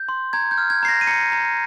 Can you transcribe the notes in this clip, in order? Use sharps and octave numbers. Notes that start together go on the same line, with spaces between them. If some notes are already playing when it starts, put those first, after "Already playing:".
Already playing: G6
C6
A#5 G#6
G6
F6
G#6
A#5 C7
A#6
D#7
A#5 C#7
A#5